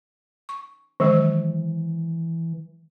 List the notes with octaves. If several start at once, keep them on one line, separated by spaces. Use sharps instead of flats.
C#6
D#3 E3 F#3 G#3